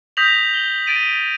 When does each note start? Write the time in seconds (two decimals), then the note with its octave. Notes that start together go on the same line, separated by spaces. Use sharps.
0.17 D#6 G6 A#6 B6 F7 F#7
0.54 F#7 G7
0.87 A6 D7 D#7